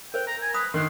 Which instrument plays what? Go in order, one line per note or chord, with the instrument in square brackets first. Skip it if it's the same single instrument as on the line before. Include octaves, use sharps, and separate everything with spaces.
[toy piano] A#4 C5 [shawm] G5
[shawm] A#5
G#5
[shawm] B4 [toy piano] B5 D#6
[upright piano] D#3 F#6 [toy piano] A#4 [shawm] C6